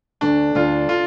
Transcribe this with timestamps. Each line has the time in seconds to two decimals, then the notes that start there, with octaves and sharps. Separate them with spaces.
0.21 D2 D4
0.55 D2 F4
0.89 F4